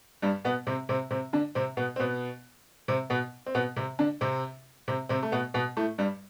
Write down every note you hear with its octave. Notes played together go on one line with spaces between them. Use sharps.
G2 G3
B2 B3
C3 C4
C3 C4
C3 C4
D3 D4
C3 C4
B2 B3
C4
B2 B3
C3 C4
B2 B3
C4
B2 B3
C3 C4
D3 D4
C3 C4
C3 C4
C3 C4
A3
B2 B3
B2 B3
A2 A3
G2 G3